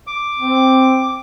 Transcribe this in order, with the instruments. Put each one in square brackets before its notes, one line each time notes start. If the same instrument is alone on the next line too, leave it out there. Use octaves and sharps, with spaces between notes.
[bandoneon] D6
[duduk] C4